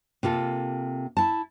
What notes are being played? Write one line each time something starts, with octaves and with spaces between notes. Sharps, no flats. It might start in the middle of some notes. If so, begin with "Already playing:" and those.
C3 A#3 F4 A4
E4 A5